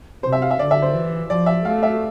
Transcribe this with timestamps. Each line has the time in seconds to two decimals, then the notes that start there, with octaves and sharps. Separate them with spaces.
0.23 C3 C5
0.33 E5
0.42 F5
0.51 E5
0.59 D3 D5
0.71 E5
0.82 C5
0.94 E3
1.30 F3 D5
1.46 E5
1.65 A3 F5
1.83 E5